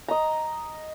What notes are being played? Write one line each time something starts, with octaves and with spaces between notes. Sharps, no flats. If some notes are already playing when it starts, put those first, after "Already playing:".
D#5 A#5